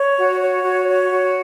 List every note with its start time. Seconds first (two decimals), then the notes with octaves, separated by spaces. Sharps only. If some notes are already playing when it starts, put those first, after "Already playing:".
Already playing: C#5
0.17 F#4
0.40 C#5
0.64 F#4
0.88 C#5
1.11 F#4